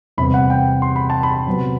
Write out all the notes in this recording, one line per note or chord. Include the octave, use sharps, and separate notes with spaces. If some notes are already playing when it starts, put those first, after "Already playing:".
E2 C3 G3 B3 B5
F#5
G5
C6
B5
A5
B5
C3 F#3 B3